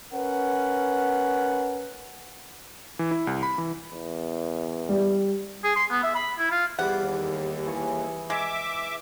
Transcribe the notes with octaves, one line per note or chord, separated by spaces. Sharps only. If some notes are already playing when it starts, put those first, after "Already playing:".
C#4 A#4 B4 F#5
E3
E4
C2
B5
E3
E2
G3
G#4
C6
B3
E5
B5
E4
F4
E2 G3 F#5 B5
D#2
E3 G#4 C#6
G#3 E5 D6